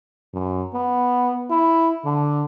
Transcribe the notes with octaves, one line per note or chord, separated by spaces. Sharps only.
F#2
B3
E4
D3